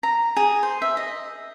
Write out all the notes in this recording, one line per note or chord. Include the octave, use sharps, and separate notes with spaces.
A#5
G#4
C5
E5
D#5